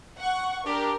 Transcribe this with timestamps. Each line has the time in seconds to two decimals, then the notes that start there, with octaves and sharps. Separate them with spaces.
0.20 F#5 C#6
0.66 D4 G4 A#4